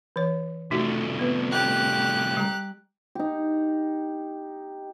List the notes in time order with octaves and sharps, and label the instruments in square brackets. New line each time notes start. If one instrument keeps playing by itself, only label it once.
[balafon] E3 C#5
[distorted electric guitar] C2 A3 [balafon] D#4 F#4
[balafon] B3 B4
[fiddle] G4 F#6
[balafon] G3 A#5
[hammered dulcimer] D#4 G4